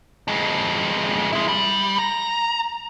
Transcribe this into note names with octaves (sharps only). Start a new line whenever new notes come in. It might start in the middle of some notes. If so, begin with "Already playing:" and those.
F2 G#3
G#3 E4
G3
A#5